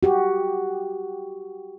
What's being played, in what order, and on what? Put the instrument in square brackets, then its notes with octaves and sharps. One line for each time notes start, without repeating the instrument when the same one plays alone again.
[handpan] F#4 G4